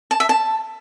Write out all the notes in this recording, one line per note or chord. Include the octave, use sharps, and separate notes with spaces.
A5
E5
A5